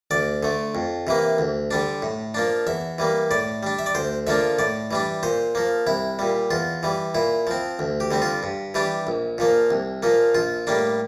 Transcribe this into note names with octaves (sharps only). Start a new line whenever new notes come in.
D2 D5
D3 A3
F2
C3 E3 A#3
D2
D3 G3 D4
A2
F3 A#3 D4
E2 E5
E3 G3 A#3
A2 D5
G3 D4
E5
D5
D2 C5
D3 F3 A#3 D4 E5
A2 D5
E3 G3 D4
A#2 C5
F3 A#3
C2 E4
A#2 G3
E2 F4
E3 G3
A#2 E4
F3 C4
D2
G4
D3 G3 C4
F4
G2
E3 G3 D4 G4
A#1
A#2 F3 A#3
C2
A#2 F3 A#3
A#1 F4
A2 G3 A#3 D4